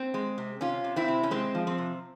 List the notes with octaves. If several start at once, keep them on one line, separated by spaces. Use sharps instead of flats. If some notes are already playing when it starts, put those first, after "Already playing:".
Already playing: C4
G#3
C3
C3 C#4 F4
C3
C4 E4
C3
C#4
G#3 C4
F3
C4
C3